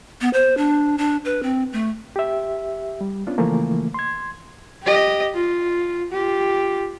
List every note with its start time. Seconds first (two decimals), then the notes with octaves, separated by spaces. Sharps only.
0.21 B3
0.33 C5
0.57 D4
0.98 D4
1.25 B4
1.43 C4
1.73 A3
2.16 G4 E5
3.01 G3
3.27 B3 C#4 D4 F4
3.38 C#3 E3 F3 A3 A#3
3.94 C6 G#6
4.83 G4 D#5
5.34 F4
6.12 F4 G4